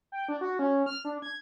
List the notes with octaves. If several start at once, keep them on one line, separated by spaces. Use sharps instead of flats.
G5
D4
F#4
C#4
F6
D4
G#6